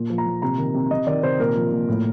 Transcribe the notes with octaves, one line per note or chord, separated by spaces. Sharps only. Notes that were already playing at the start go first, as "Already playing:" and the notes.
Already playing: A#2
F3
A#5
A#2
C3 A#5
D#3
C3
C3 D#5
D#3 D5
C3 C5
A#2 A#4
F3
A#2
A2